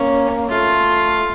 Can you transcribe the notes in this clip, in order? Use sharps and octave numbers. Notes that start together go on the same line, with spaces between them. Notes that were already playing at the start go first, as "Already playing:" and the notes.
Already playing: A#3 C#4
A3 F4